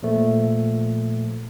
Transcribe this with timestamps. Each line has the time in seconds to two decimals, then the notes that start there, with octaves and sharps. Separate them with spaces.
0.03 A#2 F3 A3